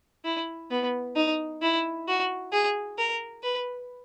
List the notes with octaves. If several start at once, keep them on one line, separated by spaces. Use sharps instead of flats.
E4
B3
D#4
E4
F#4
G#4
A#4
B4